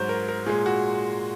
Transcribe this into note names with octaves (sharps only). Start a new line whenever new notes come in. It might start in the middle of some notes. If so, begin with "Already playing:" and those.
Already playing: G#2 F#3 C5 C#5
A#4
A#4
A#2 G#3 G#4
F#4